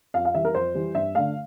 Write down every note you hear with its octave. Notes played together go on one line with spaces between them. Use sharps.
F2 F5
F5
E3 G3 E5
A#4
F2 C5
E3 G3
G2 E5
D3 A3 F5